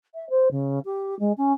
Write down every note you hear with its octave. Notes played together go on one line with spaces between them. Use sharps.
E5
C5
C#3
G4
G#3
C#4